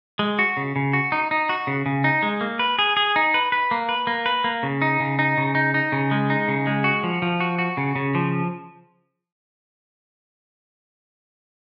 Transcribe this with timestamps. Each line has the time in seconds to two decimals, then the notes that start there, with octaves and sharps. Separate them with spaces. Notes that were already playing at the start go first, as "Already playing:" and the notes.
0.19 G#3
0.39 F#4
0.57 C#3
0.76 C#3
0.93 F#4
1.12 D#4
1.31 D#4
1.49 F#4
1.67 C#3
1.86 C#3
2.04 D#4
2.23 G#3
2.41 A#3
2.59 B4
2.79 G#4
2.97 G#4
3.16 D#4
3.34 B4
3.52 B4
3.71 A#3
3.89 B4
4.07 A#3
4.26 B4
4.44 A#3
4.63 C#3
4.82 D#4
5.00 C#3
5.19 D#4
5.38 C#3
5.55 D#4
5.74 D#4
5.92 C#3
6.11 G#3
6.30 D#4
6.48 C#3
6.67 G#3
6.84 F#4
7.03 F3
7.22 F3
7.40 F#4
7.59 F#4
7.77 C#3
7.96 C#3
8.15 F3